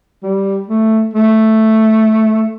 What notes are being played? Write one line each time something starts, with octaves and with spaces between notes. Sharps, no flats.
G3
A3
A3